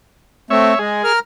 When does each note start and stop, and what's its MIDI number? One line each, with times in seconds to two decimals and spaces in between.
0.50 0.74 57
0.50 0.74 60
0.50 0.79 73
0.50 0.79 76
0.79 1.02 56
0.79 1.13 68
1.04 1.19 70
1.04 1.19 89